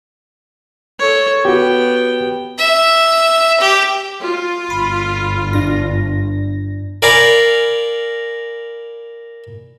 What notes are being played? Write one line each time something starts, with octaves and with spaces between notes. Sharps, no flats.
A4 C#5
B3 F#4 G4 G5
E5
G4
F4
G1 B5
G2 D4 A#6
A#4 D5 F5 G#5 A#5 B5